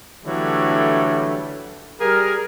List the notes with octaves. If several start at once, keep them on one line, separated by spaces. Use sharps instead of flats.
D3 E3 F#3 G3 A3
G3 G#4 A#4